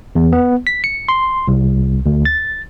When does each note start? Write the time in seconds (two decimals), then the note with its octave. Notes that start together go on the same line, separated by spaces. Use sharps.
0.15 E2
0.33 B3
0.67 B6
0.84 C#7
1.09 C6
1.48 C2
2.06 D2
2.25 A6